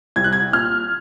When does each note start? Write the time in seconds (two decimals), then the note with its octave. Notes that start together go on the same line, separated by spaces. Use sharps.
0.16 C2 G#6
0.24 F#6
0.33 G#6
0.53 A#2 F6